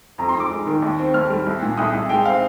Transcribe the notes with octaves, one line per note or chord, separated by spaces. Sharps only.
F2 A#5
C6
F2
D6
G#3
D#3
D#2
C4
D#2 F6
G3
C2
A#2
C2 D#6
C2
G#3 G5
C4 F5